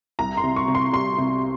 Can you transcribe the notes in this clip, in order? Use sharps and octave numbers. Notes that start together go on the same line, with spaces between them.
C2 A#5
C6
C3
C#6
C3
C6
G3 C6
C3